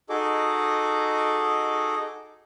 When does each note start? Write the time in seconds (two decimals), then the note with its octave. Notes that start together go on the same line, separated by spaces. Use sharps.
0.09 D#4 F#4 G#4 A4 D#5 D6